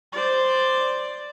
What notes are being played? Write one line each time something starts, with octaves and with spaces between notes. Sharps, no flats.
C5 D5